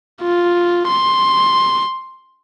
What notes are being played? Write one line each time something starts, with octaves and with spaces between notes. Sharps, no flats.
F4
C6